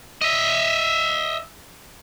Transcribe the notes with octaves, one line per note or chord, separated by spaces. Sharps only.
D#5 E5